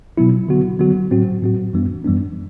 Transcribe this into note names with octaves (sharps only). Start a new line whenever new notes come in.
B2 F#3 B3 E4
D3 F#3 B3 F#4
D3 F#3 B3 F#4
A2 F#3 C4 F#4
A2 F#3 C4 F#4
F#2 E3 G3 B3 D4
F#2 E3 G3 B3 D4